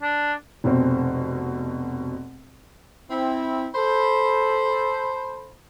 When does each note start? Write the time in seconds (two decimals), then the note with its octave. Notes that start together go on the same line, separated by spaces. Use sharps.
0.02 D4
0.64 F1 B2 C4
3.10 C4 E4
3.74 A4 C5 B5